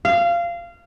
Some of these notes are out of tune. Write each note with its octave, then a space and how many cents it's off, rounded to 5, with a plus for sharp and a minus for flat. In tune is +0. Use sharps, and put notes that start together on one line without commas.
F5 -20